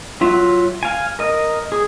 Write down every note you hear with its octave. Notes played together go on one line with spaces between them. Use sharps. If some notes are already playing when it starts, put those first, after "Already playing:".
F#3 F4 E5
F5 G#5
A#4 D#5
G#4